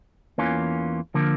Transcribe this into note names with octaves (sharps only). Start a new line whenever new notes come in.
E2 E3 A#3 C#4 F4
D3 F3 A#3